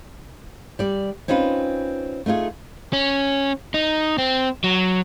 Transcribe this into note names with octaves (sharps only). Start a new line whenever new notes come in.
G3 D5
C4 C#4 D#4 F4 B4
A3 D#4 F4 G#4
C#4
D#4
C4
F#3